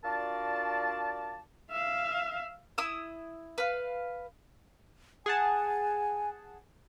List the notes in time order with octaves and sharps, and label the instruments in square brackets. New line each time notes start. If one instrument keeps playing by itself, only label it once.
[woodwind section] D4 F4 F#4 A#4 D5 A5
[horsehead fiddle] E5 F5
[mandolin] E4 D#6 E6
B4 F5
[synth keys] G#4 F#5 A5 [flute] G#5